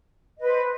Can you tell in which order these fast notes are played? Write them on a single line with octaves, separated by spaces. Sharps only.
D#5 B4 C5